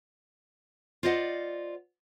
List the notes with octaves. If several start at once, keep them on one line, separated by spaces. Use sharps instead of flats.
F4 C5 D5 D#5 F#5